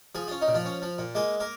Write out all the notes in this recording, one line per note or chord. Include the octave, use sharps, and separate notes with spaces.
F3 G#4
C#4 F4
D#4
A#2
F3 F4
C#4
F3
A#2
G#3 A#3 G#4
A#3 A#4